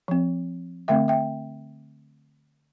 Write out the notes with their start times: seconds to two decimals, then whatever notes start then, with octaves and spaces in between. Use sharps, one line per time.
0.08 F3 C4
0.88 D3 A3 C4 E5 G5
1.08 E5 G5